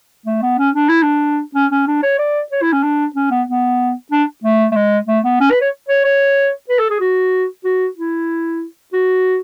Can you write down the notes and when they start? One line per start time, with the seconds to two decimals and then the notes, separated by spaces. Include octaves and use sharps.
0.26 A3
0.42 B3
0.58 C#4
0.75 D4
0.89 E4
1.02 D4
1.55 C#4
1.71 C#4
1.87 D4
2.03 C#5
2.19 D5
2.52 C#5
2.62 E4
2.73 C#4
2.83 D4
3.16 C#4
3.31 B3
3.47 B3
4.12 D4
4.44 A3
4.72 A3
4.76 G#3
5.08 A3
5.24 B3
5.41 C#4
5.51 B4
5.61 C#5
5.89 C#5
6.05 C#5
6.69 B4
6.79 A4
6.90 G#4
7.00 F#4
7.64 F#4
7.97 E4
8.93 F#4